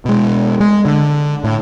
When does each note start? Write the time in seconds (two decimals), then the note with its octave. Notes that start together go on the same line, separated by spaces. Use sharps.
0.05 B2 G#3
0.60 G#3
0.85 D3
1.44 A2